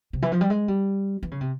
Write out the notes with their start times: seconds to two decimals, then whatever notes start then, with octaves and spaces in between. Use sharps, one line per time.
0.13 C3
0.22 E3
0.32 F3
0.41 G3
0.50 G#3
0.68 G3
1.23 E3
1.31 C#3
1.41 C3